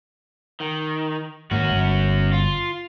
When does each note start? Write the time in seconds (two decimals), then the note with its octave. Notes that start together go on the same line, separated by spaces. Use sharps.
0.60 D#3
1.51 G#2 D#3 A#3 C#4 F#4
1.68 G1
2.32 F4